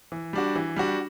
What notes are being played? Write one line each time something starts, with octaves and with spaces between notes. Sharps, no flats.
E3
G3 D4 F#4
E3
G3 D4 F#4